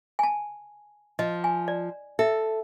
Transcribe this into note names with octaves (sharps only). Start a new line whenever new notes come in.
G#5 A5
F3 D#5
G#5
D5
A4 E5